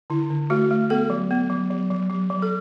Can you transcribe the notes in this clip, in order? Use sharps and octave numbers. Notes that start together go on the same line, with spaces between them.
D3 E4
D3
A3 F#4
A3
B3 A4
F#3
B3
F#3
F#3
F#3
F#3
F#3
A4